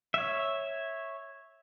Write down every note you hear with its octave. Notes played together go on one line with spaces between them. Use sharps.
C#5 E5